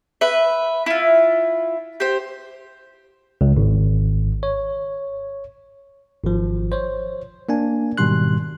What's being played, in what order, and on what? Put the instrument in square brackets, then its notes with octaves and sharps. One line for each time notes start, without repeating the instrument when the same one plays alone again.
[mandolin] B4 E5
E4 F4
G4 C5
[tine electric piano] C#2
G#1
C#5
G#1 F3
C5 C#5
A#3 D4 G#5
G#2 B2 D#3 G3 C6 F#6